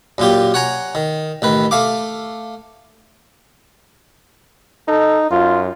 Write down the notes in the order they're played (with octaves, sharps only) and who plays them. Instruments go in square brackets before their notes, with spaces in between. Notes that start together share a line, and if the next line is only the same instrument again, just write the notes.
[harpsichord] F#2 A#2 F4 G4
C#5 F#5 G#5 A#5
D#3
A1 D#3 B4
A3 F5 D6
[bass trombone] D#4 [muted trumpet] A4
[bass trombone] F#2 [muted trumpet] F4